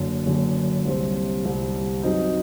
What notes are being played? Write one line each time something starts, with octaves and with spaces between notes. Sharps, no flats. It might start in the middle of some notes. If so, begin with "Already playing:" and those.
Already playing: F#1 F#2 D3
F#1 F#2 D3
C2 C3 G3 C4
C2 C3 G3 C4
F#2 F#3 C4 D#4